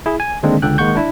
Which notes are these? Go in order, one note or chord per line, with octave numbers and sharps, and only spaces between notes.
E4 G#4
G#5
D3 D#3 G#3 A#3 C4 D4
C#2 D3 A4 G5 F#6
D#3 G#3 A#3 F#5 C#6 G6
D4 E4